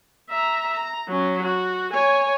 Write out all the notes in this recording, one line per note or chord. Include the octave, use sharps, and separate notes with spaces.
E5 A#5
A#5
F#3 C#4
F#4
C#5 G#5